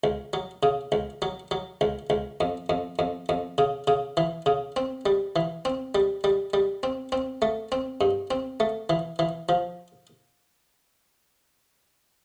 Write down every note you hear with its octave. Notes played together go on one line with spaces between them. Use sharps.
C#2
F#3
C#3
C#2
F#3
F#3
C#2
C#2
F2
F2
F2
F2
C#3
C#3
E3
C#3
C4
G3
E3
C4
G3
G3
G3
C4
C4
A3
C4
G2
C4
A3
E3
E3
F3